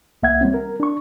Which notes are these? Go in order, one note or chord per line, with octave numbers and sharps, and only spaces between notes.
C2 A#3 E5 F#5 G#6
G3 C4 C#4
A#4
D4 C#6